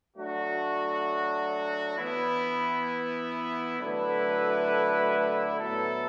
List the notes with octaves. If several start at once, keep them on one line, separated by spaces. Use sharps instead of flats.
F#3 A3 D4 F#4
E3 B3 E4
D3 F#3 A3 E4 B4
A2 F#3 B3 E4 A4